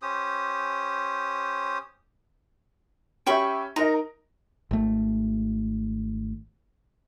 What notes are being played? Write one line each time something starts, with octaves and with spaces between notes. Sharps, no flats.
C#4 G4 C5 D#6
C#4 G4 E5 G5 B5 C#6
D#4 A#4 D#5 A#5
G#1 A3